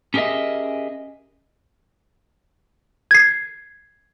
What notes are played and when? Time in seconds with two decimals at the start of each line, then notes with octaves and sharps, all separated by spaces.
0.14 C#4 G4 G#4 A#4 D#5 E5
3.11 G#6 C7